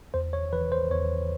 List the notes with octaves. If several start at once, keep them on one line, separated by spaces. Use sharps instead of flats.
E2 C5
C#5
E3 B4
C5
E2 C#5